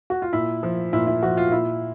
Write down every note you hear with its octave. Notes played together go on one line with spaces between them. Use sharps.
F#4
F4
A#2 E4
F3
A#2 E4
E4
F3 F#4
F4
A#2 E4